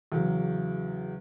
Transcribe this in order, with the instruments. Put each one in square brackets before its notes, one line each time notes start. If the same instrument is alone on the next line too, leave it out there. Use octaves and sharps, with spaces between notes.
[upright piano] E2 C#3 F#3